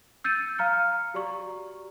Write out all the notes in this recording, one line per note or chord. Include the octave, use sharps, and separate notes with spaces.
E6 G6 A6 C#7 D#7
F5 A#5 F6 C#7
F#4 G4 D5 A#5 C#6